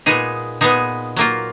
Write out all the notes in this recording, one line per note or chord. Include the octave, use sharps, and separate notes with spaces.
A#2 G#3 B3 D#4 G#4
A#2 G#3 B3 D#4 G#4
F#3 A#3 F4